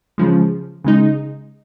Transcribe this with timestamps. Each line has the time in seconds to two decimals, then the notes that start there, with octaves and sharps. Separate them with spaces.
0.18 C#3 F3 G#3
0.84 C#3 G#3 D#4